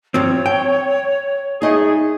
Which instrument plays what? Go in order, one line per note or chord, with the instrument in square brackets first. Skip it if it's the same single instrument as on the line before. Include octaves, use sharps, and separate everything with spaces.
[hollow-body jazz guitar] G2 F3 C4 [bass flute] C#5
[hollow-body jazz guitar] G5
[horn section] G#3 A3 G#4 [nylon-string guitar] D#4 D#5